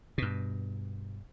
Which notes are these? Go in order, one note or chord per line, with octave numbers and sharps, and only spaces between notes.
G2 B2